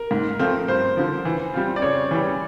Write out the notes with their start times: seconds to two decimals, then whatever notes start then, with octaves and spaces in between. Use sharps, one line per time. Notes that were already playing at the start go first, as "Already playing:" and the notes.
Already playing: A#4
0.11 G#2
0.39 F3 A3 C4 F4
0.68 G2 C5
0.97 D3 F3
1.25 E3
1.54 G3 C4 F4
1.76 D5
1.82 C#3 C#5
2.11 E3 G3